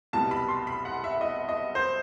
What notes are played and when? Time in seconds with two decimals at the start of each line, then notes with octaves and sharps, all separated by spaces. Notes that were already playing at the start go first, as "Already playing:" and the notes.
0.13 C2 B2 G3 A5
0.31 B5
0.48 C6
0.67 B5
0.85 F#5
1.04 E5
1.21 D#5
1.49 D#5
1.75 C5